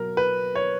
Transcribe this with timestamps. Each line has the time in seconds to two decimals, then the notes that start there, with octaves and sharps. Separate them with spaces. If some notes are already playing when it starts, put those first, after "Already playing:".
Already playing: B2 F#3 A#4
0.17 B4
0.55 C#5